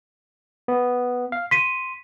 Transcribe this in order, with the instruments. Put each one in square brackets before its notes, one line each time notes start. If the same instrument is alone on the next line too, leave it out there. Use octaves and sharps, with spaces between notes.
[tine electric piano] B3
F5
[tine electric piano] C6 [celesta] B6 D#7